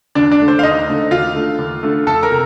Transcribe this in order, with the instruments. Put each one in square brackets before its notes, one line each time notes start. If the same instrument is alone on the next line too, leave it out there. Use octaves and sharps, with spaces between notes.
[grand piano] D#2 D4 D5
D4 D5
D3 A3
C5
F5
D#2 D#4 D#5
D3 A3
D#2 F4 F5
D3 A3
D#2
D3 A3
F2 A4 A5
A#4 A#5
C3